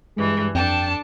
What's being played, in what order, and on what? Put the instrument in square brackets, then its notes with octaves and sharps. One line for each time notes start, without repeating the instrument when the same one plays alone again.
[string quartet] G2 E3 [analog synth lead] G#3
[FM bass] F2 [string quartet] D4 A4 A5 [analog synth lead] G5